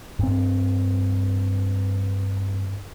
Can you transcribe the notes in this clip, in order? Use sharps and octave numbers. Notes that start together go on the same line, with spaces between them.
G2 C4